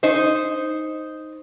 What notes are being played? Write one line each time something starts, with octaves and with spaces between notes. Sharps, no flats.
D#4 C5